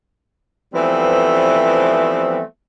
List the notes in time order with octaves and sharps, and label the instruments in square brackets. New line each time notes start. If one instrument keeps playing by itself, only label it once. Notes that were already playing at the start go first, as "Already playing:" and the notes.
[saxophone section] E3 F3 G3 A3 B3 C4